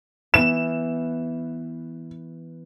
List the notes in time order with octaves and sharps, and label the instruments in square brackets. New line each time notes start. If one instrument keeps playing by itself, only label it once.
[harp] E3 B3 [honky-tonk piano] E7